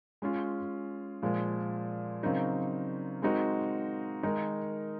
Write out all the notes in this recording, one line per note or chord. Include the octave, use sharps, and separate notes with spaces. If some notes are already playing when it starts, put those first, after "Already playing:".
G#3 C#4 F4
A#2 F3 G#3
C#3 F#3 C4 D#4 A#4
G#3 C4 D#4 F#4 A#4
D#3 G#3 D#4 A#4